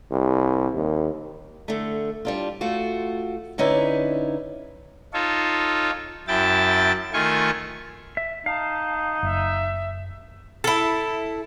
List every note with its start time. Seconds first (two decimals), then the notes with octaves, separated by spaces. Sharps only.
0.11 C2
0.74 D#2
1.68 D3 A3
2.25 G3 D4 F4
2.61 A3 F4 F#4
3.58 D3 C#4 D#4 E4 B4 D5
5.13 D#4 F4 A4 C#5
6.28 F#2 E4 G5 A5 A6
7.13 D#3 A3 F4 G#5 C#6
8.17 E5
8.46 D#4 F5 A5
9.23 F#1 E5
10.64 E4 A4